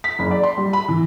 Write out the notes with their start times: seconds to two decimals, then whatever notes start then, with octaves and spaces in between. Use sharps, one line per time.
0.04 B6
0.19 F#1
0.31 D5
0.43 C6
0.57 G3
0.73 B5
0.88 E3